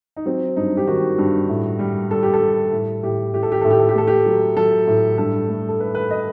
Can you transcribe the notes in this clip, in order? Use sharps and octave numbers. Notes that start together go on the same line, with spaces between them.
D#4
F#3 C4
G2 D#4
G4
D#3 F#4
G2
A2
G3
G3 A4
G4
A4
G3
A2
A2 G4
A2 G4
A4
G4
A2 A4
G4
A4
G4
A3 A4
G4
F#3
F#3 A4
A2
G2 A4
A3
A4
A3 B4
B4
D#5